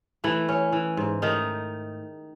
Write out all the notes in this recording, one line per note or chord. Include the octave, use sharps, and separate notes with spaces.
E3 A3 E4
C#4
E3
G#2
D#3 A3 D#4